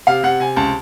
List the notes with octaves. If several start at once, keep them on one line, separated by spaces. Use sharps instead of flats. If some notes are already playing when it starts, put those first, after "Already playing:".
C3 F5
C3 F#5
C3 G#5
C#2 A5